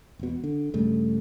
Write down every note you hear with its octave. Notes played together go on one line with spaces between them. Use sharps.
E1 B2
D3
G2 C#3 G3 A3